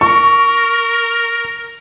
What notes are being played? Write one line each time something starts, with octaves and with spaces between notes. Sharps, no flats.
A#4 C#6